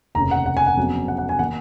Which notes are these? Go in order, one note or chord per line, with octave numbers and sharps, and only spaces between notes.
F1 D#2 C#3 A#5
F#5
F#5
G#5
F#5
F2 C#3 F#3 B3
F#5
F#5
G#5
D#3 A#3 F#5